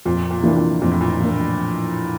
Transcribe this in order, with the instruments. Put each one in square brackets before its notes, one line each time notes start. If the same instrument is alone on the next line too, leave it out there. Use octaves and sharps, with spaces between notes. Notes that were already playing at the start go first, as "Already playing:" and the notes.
[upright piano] F2 [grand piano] A#2
[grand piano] A#2
C3
[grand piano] A#2 [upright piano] E3 A#3 D4
[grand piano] A#2
[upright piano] F2 [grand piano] A#2
[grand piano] A2
A#2
[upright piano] E3 A#3 D4